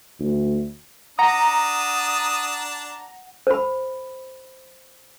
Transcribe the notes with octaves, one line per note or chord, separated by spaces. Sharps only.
D2
D4 F#5 A#5 D#6
C5 B5